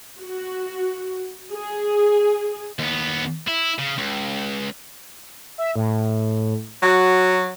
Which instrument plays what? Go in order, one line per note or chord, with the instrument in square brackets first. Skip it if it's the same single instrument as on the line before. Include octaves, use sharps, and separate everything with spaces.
[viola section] F#4
G#4
[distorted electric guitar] D#2 B3
E4
C#3
C#2
[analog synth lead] E5
A2
[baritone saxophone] F#3 [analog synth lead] F#4